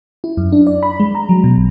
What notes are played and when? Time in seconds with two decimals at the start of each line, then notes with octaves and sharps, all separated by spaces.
0.24 E4
0.37 F#2
0.52 D4
0.67 D5
0.83 B5
1.00 G#3
1.15 A#5
1.29 F#3
1.44 B2
1.57 A#1